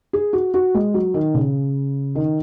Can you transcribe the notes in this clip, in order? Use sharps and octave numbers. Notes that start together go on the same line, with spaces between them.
G#4
F#4
F#4
G#3
F#3
D#3
C#3
D#3